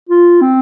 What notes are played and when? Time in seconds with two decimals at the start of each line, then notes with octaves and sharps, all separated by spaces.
0.09 F4
0.41 C4